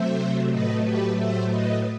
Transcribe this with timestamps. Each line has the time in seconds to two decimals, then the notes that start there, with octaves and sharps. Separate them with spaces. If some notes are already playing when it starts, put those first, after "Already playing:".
Already playing: C3 F#3 A3 C5 E5
0.50 A2 F#3 A3 B4 D#5
0.83 G4 B4
1.16 C5 E5
1.49 B4 D#5